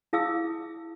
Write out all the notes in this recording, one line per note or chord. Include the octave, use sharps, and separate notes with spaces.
E4 G#4 F5 D#6 E6